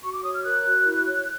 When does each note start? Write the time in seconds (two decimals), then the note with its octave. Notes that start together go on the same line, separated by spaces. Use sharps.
0.02 F#4 C#6
0.14 D6
0.23 C#5 D#6
0.34 F6
0.44 A#4 F#6
0.65 F#4
0.85 E4
1.06 C#5